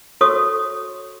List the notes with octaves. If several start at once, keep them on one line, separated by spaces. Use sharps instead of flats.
F#4 A4 C#5 C#6 D#6